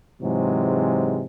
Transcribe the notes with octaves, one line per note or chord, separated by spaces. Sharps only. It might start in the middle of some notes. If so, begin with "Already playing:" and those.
G#2 C3 E3 F#3 G#3